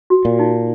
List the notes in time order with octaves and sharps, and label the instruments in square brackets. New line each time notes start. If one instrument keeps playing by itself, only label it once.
[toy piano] F#4
[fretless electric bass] A#2
[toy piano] D#4